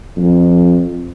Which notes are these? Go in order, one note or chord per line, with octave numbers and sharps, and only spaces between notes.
F2